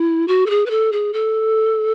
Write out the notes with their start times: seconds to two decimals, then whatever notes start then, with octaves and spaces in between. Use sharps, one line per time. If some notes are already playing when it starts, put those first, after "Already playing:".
Already playing: E4
0.28 F#4
0.46 A4
0.50 G#4
0.66 B4
0.70 A4
0.92 G#4
1.13 A4